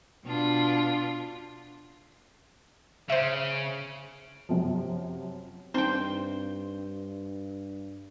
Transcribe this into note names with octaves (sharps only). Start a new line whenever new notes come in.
B2 D4 F4
C#3 C5 E5
F#2 C3 F3
G2 C4 D#4 C5 G5